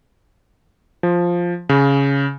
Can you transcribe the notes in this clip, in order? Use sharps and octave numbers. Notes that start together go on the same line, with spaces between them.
F3
C#3